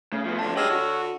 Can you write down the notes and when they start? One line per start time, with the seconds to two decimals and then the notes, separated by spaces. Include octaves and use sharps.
0.12 C#3 A3
0.25 F3 B3
0.39 A2 D3 F3 A5
0.56 G#3 D4 G4 C#5 E6 F6
0.71 D3 F#4